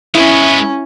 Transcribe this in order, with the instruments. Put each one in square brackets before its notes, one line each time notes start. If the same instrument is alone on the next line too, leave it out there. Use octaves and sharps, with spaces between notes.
[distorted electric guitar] G#3 B3 [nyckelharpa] C#4 [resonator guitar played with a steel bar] E4